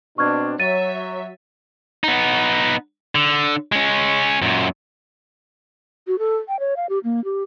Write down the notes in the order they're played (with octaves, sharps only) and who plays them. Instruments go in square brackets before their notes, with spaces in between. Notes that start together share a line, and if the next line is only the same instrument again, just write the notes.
[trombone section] B2 C4 D4 [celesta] C#6 F6 G#6
[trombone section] F#3 [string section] C#5 E5 [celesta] A6 D#7
[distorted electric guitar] B3 D#4
D3
G#3 C#4
F#2 A#2
[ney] F#4
A4
G5
C#5
F5
G4
A#3
G4